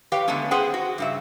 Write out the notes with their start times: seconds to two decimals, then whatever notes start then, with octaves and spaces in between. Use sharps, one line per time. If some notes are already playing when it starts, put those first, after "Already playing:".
0.12 G4 B4 C#5 F5 G5
0.28 D3 G#3 A3 B3 C#4
0.51 C#4 G#4 B4 C5 F#5 G5
0.74 F#4
0.98 G2 C#3 E5